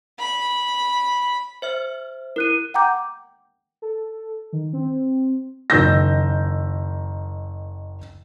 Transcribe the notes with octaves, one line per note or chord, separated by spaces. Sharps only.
B5
C5 E5 F6
E4 A#4 F#6 D#7
F#5 G5 A#5 D6 G6
A4
D#3
C4
F#1 D#3 E6 G6 A#6